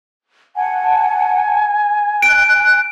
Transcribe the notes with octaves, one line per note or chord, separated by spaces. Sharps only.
F#5 G#5 A5
F#6 D7